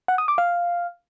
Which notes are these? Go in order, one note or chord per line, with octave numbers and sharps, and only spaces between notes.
F#5
D#6
D6
F5